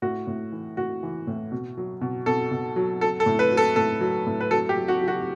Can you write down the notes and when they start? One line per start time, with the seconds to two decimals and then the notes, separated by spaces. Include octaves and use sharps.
0.02 A2 F#4
0.27 A2
0.52 E3
0.77 A2 F#4
1.03 E3
1.27 A2
1.52 B2
1.77 F#3
2.01 B2
2.26 B2 A4
2.51 B2
2.76 F#3
3.01 F#3 A4
3.20 A4
3.26 A2
3.39 B4
3.52 F#3
3.57 A4
3.76 A2 A4
4.01 F#3
4.27 A2
4.41 B4
4.51 F#3 A4
4.69 G4
4.76 F#3
4.88 F#4
5.01 F#3
5.08 F#4